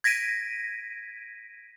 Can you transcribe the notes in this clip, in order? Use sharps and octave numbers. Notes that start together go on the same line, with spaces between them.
G#6 A#6 B6 D7 D#7